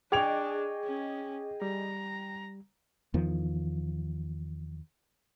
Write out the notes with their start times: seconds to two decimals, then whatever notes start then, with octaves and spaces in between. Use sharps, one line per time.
0.12 D4 G#4 D#5 G5 C#6 D6 G#6 F7
0.84 C#4
1.62 G3 A#5
3.14 E2 D#3 F3